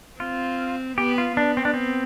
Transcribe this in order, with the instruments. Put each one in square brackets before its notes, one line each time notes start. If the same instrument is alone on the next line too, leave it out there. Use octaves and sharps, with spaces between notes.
[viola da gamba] C4 [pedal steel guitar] F4
[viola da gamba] B3 [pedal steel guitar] G4
[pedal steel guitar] F4
[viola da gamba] B3 [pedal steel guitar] D4
[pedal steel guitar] C4
D4
C4